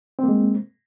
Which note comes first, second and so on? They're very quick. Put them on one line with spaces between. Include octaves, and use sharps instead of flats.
C4 A#3 G#3